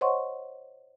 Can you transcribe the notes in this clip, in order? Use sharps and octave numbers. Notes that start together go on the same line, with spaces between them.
C5 C#5 D#5 F#5 C6 C#6